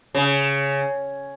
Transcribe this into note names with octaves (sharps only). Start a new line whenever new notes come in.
C#3